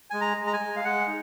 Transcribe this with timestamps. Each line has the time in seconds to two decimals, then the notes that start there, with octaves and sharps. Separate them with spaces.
0.10 G#3 G#5
0.21 A#5
0.37 G#3
0.47 A#5
0.53 G#5
0.60 G#3
0.76 F5
0.84 G#3 F#5
1.07 D#4